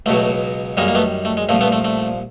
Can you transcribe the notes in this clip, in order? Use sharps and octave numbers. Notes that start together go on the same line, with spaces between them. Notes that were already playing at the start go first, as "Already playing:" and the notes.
C#2 B2 F#3 A3
F#2 D#3 G3 G#3 A#3
A#3
A3 B3
A3
G#3
C2 A#2 F3 A3
A3 B3
A3
A3